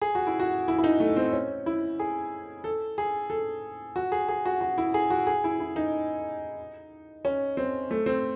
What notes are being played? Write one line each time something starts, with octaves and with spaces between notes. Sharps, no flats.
G#4
F#4
E4
F#4
E4
E4
D#4
A3
C4
C#4
E4
G#4
A4
G#4
A4
F#4
G#4
G#4
F#4
F#4
E4
G#4
F#4
G#4
E4
E4
D#4
C#4
C4
A3
C4